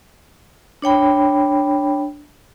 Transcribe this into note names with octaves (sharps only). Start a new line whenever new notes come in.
D4 C#5 G5 B5